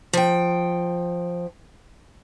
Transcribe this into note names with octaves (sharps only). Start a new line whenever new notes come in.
F3 G5